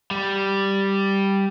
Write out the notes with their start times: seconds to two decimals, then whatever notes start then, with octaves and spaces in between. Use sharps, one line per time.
0.11 G3